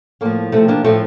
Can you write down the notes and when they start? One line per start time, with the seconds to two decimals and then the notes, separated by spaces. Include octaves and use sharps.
0.21 A2 F3 A#3
0.52 C3 F3 A3 C4
0.68 A#3 D4
0.84 A2 F3 A3 C4